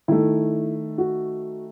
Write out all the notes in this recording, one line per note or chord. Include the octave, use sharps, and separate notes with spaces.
D#3 A3 E4
F#4